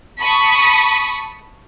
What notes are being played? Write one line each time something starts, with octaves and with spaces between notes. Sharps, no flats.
A5 B5 C#6 D#6 B6